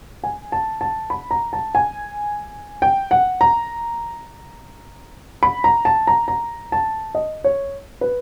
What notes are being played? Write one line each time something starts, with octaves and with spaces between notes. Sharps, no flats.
G#5
A5
A5
B5
A#5
A5
G#5
G5
F#5
A#5
B5
A#5
A5
A#5
A#5
A5
D#5
C#5
B4